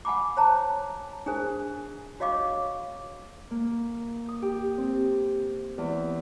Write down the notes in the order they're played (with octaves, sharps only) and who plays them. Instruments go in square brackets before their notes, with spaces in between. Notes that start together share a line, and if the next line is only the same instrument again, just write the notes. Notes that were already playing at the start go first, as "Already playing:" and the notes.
[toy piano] F#5 G#5 B5 D6
C5 C#5 A5 A#5
D4 G#4 A#4 C5 G#5
F#4 C#5 D#5 F5 C#6 D6
[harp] A#3
D#6
G4
C4
E2